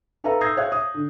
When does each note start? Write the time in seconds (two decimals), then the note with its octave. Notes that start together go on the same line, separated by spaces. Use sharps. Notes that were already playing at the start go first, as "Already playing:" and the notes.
0.24 D#4 A4 B4 E5 F5 A#5
0.41 D#6 E6 G6 G#6 A#6 C7
0.57 C5 C#5 E5 F5 F#6 G#6
0.72 D#6
0.94 D3